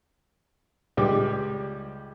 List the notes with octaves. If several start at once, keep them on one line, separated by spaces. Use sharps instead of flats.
C#2 G3 G4 G5 D6